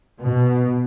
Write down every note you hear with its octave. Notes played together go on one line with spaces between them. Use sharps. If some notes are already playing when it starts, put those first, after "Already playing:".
B2